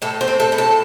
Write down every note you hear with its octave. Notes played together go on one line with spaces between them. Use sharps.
A2 A4
C5
C4
A4
A2
A4